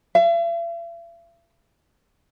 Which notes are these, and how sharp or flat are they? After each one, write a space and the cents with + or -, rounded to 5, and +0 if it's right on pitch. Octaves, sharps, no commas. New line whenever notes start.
E5 +45